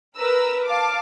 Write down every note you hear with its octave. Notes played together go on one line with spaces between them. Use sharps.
A#4 B4 A#5 E6
F5 A5 D6